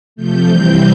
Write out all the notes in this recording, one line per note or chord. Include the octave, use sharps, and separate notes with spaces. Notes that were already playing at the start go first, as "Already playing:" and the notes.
C3 F3 A3 G6
C3 E3 G3 C4